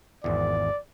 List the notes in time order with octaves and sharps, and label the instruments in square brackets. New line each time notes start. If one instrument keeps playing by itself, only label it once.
[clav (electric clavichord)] G#1 E2 [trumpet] D5